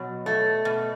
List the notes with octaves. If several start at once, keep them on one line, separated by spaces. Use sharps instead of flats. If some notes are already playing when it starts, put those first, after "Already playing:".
Already playing: B2 F#3
A3
B2